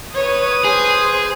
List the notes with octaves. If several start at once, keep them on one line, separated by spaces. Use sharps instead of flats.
B4 C#5 D#6
G#4 C5